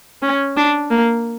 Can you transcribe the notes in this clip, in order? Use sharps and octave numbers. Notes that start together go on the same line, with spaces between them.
C#4
D4
A#3